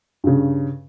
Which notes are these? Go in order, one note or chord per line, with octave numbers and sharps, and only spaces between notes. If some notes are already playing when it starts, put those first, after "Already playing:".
G2 C#3